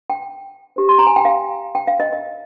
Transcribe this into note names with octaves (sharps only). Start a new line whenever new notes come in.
G5
G4 C5
C6
A#5
G#5
G5
F5
G5
F5
D#5
D#5